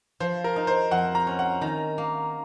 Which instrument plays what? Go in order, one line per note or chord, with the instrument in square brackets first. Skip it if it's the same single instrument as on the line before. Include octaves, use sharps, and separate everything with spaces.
[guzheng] F3 [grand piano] C5
[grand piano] A#4
[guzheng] D#4
[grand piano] C5
[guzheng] F2 [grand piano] F#5
[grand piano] A#5
[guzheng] C#4
[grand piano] F#5
[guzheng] D#3 [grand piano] A#5
[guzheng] A#3